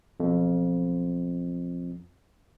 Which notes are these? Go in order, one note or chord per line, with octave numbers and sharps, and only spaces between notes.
B1 F2